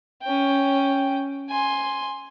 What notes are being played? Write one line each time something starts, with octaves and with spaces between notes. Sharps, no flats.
C#4 G5
G#5 C6